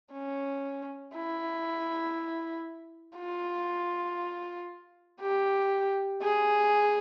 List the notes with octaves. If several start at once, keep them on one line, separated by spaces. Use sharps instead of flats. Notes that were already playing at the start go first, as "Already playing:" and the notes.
C#4
E4
F4
G4
G#4